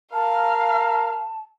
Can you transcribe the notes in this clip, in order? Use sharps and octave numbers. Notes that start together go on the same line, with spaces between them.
A#4 F5 A5